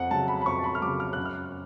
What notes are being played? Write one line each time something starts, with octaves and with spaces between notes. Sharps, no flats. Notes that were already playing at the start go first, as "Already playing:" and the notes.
Already playing: F2 F#5
C#3 F#3 A5
B5
B5
F2 C#6
A5
B5
F6
C#3 F#3 D6
F6
F#6
F#2
F6